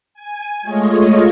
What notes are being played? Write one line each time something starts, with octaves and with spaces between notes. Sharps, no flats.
G#5
G#3 A3 F4 C#5 D#5